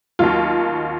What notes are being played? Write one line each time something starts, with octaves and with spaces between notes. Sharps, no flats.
D#2 D#3 F#3 F4